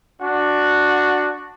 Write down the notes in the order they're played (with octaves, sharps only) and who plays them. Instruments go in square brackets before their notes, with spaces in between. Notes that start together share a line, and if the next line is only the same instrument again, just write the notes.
[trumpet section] D4 F#4